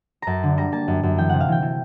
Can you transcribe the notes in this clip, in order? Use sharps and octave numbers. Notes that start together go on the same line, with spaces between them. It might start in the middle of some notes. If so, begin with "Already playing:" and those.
F#2 A5 A#5
D3
G3 A#5
A#3 A5
F#2
F#2
E3 G5
C3 F#5
F5
E3 G5
E3